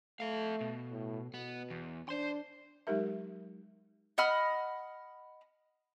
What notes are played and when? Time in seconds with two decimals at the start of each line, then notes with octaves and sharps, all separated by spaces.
0.20 A3 A4 F5
0.61 B2
0.91 A2
1.34 B2 B3
1.70 E2
2.09 D4 C5 C6
2.87 F#3 G#3 D#4 G4 A#4 E5
4.18 D#5 F#5 B5 F6